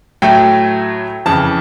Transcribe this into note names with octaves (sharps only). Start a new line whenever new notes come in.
A2 F#3 A3 G5
F2 C#3 E3 A5